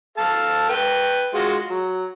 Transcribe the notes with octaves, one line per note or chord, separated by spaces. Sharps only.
A4 F5 A5
B4 G5
G#3 F4 F#4
F#3